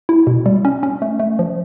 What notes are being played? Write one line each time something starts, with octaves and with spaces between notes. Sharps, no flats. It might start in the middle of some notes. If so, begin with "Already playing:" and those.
E4
B2
G3
C#4
C#4
A3
A3
F3